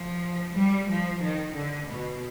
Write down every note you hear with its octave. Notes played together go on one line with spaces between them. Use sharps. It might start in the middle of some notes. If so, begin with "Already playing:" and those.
Already playing: F3
G3
F3
D#3
D3
B2